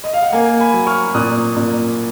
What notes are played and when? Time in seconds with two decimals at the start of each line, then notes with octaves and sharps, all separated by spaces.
0.04 D#5
0.14 F5
0.23 F#5
0.33 A#3 F5 G#5
0.60 G#5 B5
0.74 F#3
0.87 C#6 F6
1.14 A#2 D#6 F#6
1.56 A#2